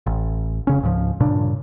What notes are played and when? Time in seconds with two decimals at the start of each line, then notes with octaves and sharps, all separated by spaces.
0.06 A1
0.67 F1 C#3 C#4
0.83 C#2 G#2 F3
1.20 G2 A#2 C#3 D4